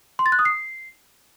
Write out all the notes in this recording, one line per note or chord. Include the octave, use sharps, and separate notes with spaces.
C6
A6
F#6
D#6
C7